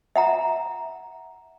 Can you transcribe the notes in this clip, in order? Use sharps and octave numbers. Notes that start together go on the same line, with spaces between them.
E5 F#5 A#5